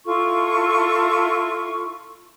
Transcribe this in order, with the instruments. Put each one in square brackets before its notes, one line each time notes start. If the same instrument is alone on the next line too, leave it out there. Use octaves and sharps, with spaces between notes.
[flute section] E4 F4 A4 C#6